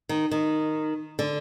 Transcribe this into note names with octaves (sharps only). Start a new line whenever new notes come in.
D#3
D#3
D3